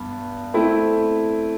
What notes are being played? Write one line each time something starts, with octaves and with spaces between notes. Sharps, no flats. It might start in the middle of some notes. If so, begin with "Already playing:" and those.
Already playing: G2 B3
A3 C4 E4